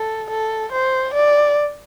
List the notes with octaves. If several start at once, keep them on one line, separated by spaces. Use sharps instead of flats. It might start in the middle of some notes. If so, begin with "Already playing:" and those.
Already playing: A4
A4
C5
D5